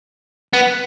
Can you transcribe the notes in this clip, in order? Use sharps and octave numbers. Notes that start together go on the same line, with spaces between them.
B3